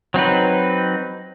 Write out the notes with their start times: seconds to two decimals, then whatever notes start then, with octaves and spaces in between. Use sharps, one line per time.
0.14 F#3 C4 D#4 B4